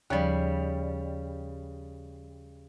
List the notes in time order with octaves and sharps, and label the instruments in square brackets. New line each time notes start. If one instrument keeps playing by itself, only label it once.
[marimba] D#2 F3 [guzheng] C#3 G3